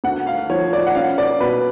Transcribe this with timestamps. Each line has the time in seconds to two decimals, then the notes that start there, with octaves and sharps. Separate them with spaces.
0.04 D2 F#5
0.27 F5
0.49 F3 C#5
0.73 D5
0.87 F#5
0.95 C#4 F5
1.18 D5
1.40 B2 B4